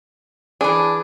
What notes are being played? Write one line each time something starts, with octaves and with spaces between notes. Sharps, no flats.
E3 D4 G#4